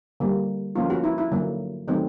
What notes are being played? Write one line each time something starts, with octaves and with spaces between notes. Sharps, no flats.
D3 G3 A#3
D3 F3 A#3 C#4 F4
F#4
E4
E4
D3 F#3 A#3
D#3 F#3 A3 C4